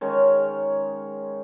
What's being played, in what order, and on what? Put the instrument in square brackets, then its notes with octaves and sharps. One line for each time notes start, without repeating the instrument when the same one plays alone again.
[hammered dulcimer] D#3 G#3 C#4 C#5